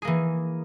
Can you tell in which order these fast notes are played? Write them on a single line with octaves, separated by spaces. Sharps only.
G#4 A#3 E3